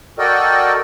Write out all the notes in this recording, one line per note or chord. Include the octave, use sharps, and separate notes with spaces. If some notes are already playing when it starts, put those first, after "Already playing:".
F#4 A4 A#4 D5 D#5 G5